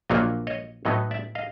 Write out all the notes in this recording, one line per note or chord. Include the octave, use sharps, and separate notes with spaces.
A#1 A#2 F#3 A#3 D4 C#5 D#5
C#5 D#5
A2 F#3 B3 D#4 C#5 D#5
D5 E5
D#5 F5